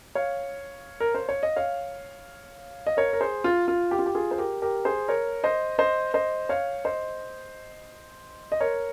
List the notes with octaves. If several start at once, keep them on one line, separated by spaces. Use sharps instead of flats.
C#5 F5
A#4
C5
C#5
D#5
C#5 F5
D#5
A#4 C#5
A#4
G#4 C5
F4
F4
G4
F4
G4
F4 G#4
C5
G4 A#4
G4 A#4
G#4 C5
A#4 C#5
C5 D#5
C5 D#5
C5 D#5
C#5 F5
C5 D#5
D#5
A#4 C#5